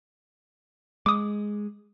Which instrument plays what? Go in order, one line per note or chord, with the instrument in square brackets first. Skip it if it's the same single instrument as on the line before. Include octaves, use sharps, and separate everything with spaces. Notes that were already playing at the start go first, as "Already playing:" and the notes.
[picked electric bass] G#3 [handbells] D6 D#6